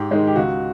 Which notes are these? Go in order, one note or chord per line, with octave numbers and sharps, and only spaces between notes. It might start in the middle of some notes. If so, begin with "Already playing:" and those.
Already playing: G#2 G4
D#3 G#3
G4
C#2 F#4